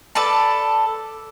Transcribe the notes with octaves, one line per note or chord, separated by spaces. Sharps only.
A4 B4 D5 A5